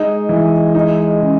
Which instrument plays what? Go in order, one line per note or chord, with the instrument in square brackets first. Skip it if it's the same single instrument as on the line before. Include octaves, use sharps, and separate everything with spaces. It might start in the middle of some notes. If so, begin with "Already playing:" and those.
Already playing: [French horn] G#3 [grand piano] D#4
[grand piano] E3
D#4
C#3